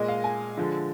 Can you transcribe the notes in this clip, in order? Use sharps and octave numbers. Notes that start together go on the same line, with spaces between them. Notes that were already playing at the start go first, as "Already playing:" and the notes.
Already playing: A#2 G#3 D#5
F5
G#5
D3 F3 G#3